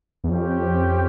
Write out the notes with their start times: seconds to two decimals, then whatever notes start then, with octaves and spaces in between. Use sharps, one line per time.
0.24 E2
0.30 F2 C#4 G4 C5 G5